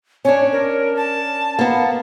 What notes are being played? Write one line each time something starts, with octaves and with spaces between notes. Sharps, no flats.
C#4 D4 C#5
A#4
A5
A#3 B3